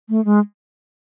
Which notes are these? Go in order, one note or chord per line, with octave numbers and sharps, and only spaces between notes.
A3
G#3